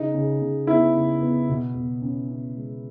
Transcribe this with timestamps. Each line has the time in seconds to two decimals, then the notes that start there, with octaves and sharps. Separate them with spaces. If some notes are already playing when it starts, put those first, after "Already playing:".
Already playing: C#3 D#4
0.14 C#3
0.41 C#3
0.67 B3 E4
0.95 C#3
1.21 B3
1.49 B2
1.75 B2
2.02 C#4
2.28 C#4
2.56 G#3